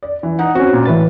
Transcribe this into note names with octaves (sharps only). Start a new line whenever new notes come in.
D5
E3
D#4 F#5
C4 C#4 F#4
A#2
A2 E3 B4 A6